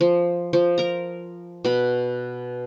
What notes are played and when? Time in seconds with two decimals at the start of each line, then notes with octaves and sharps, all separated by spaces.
0.01 F3
0.53 F3
0.78 A#4 A#5
1.64 B2 B5